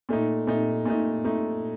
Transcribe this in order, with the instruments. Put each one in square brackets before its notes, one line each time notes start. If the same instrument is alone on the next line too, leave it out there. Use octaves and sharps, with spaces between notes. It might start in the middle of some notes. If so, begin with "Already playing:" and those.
[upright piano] A#2 A3 D#4
A#2 A3 D#4
A#2 A3 D#4
A#2 A3 D#4